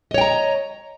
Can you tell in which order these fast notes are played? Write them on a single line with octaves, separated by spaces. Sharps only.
D#5 C#5 G5 A#5